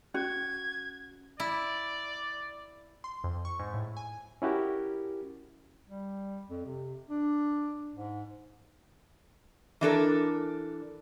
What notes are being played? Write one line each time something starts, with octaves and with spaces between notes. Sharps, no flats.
C#4 F#4 G#6
E4 D5
C6
F2
C#6
G#2
A2
G#5
C#4 E4 F#4 G4 A#4
G3
F2
C3
D4
G#2
E3 D4 A4 A#4